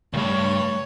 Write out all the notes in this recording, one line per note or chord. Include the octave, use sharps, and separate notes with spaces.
C#2 G2 C#3 A3 C#5